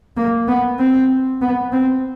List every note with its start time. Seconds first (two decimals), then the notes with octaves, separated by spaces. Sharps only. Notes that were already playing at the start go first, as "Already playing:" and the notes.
0.17 A#3
0.48 B3
0.79 C4
1.41 B3
1.72 C4